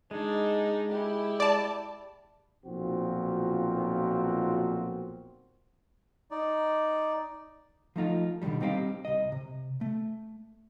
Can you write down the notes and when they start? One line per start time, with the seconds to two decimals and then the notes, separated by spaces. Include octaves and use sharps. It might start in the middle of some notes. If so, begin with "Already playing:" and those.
0.11 G#3 D4 D#4
0.91 E4 G4
1.40 D5 A5
2.66 B1 A#2 F3 C4 F#4
6.31 D#4 D5
7.96 F3 A3 D#4 F4
8.42 B2 D3 D#3 F#3 G3
8.61 G3 C4 D#4 G4 C#5 F5
9.05 C2 D#5
9.32 C3
9.81 A3